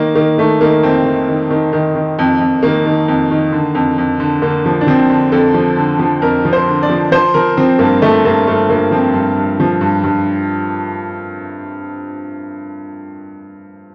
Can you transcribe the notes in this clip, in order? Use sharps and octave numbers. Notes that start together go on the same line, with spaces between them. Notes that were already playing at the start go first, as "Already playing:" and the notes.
Already playing: D#3 A#3
D#3 A#3
D#3 A3
D#3 A#3
F2 C4
D#3
D#3
D#3
D#3
D#3
F2
F2
D#3 A#3
D#3
F2
D#3
D3
F2
F2
D3
D3 A#3
F3
D4
F3 C4
D3
F2 A4
F3
D3
F3
F2 A#4
F3
C5
D3
D5
F3
F3 C5
F3 A#4
F3 C4
G2 A#3
F3 A3
G2 A#3
G2 A3
G2 A#3
F3 C4
G2
G2
F3
G2
G2